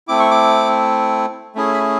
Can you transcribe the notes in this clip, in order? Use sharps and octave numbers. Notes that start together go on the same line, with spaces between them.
A3 C4 E4 D6
C#6
D6
A3 C#4 E4 G#4
B5